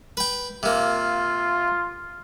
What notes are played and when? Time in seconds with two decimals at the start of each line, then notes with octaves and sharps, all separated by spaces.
0.17 B4 G5
0.63 C3 A#3 F4